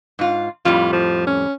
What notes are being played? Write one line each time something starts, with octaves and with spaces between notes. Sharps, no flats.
G#2 F4
F2 A2 G3 F4
F3
C#4